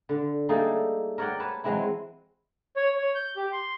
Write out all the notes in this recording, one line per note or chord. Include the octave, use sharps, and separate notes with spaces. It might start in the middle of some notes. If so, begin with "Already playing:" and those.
D3
G3 A3 A#3 D#4 G#4 A4
A#4 C#5 D5 F#5 G5
B4 C#5 A5
E3 F#3 G#3 C4 E4
C#5
C#5
G6
G4
C6